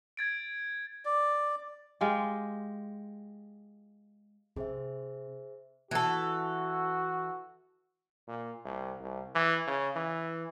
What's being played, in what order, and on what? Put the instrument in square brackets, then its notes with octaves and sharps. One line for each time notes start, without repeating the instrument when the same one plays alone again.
[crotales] G#6 A6 D7
[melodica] D5
[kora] G#3 F4 G4
[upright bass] C3 [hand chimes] G#4 C5 E5
[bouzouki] E3 A4 [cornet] F#4
[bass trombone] A#2
C2
C2
E3
C#3
E3